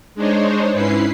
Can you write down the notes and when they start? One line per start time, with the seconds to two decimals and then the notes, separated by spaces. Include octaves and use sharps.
0.15 G#3 D4 D#4 C5 C#5
0.73 G#2 C#4 E4 B4 C7